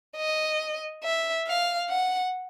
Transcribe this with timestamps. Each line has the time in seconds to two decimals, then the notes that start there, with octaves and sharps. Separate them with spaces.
0.17 D#5
1.04 E5
1.47 F5
1.90 F#5